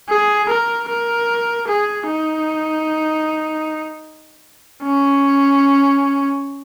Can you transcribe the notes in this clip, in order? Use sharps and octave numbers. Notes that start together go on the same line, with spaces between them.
G#4
A#4
A#4
G#4
D#4
C#4